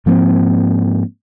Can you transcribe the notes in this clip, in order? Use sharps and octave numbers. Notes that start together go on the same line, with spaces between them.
G#2 F3 A#3 C4